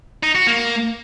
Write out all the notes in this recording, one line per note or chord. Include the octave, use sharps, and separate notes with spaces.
D#4
F#4
A#3